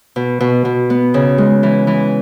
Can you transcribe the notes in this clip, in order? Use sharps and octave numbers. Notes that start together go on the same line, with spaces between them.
B2
B2
B2
B3
C#3
G#3
E3
E3